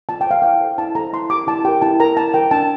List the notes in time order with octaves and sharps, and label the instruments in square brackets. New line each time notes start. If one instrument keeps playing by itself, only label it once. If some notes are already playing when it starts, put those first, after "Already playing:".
[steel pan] F4 A5
G5
C5 F5
E4 G5
A4 C5
E4 A5
A4 C5 A#5
E4 C6
G4 A#4 D6
E4 A5
G4 A#4 G5
E4 A5
A#4 A#5
E4 A5
A#4 G5
D4 A5